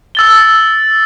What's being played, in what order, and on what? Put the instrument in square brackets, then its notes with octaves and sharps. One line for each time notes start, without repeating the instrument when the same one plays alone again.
[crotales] E6 A6 G7